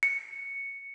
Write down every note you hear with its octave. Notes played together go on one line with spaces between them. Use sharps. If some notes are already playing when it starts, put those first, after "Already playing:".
C#7